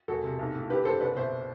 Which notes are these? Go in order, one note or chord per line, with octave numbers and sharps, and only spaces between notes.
E1 F#4 A4
C3
B1
A2
D3 G4 B4
F#1 A4 C5
C2 B4 D5
B2 C5 E5